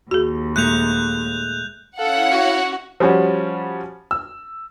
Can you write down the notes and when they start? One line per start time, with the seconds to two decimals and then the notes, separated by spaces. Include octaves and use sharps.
0.11 D#2 F#4 G#4
0.56 A#2 G#3 A3 F#6 G6 F7
1.99 C#4 E4 A4 C#5 F5 F#5
2.31 F#4
3.00 F3 G3 C#4 F#4
4.11 E6